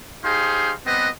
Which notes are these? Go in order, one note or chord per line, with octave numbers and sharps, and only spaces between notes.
D#4 G4 G#4 C5 F5 C6
G3 B3 C4 B4 D#5 F#5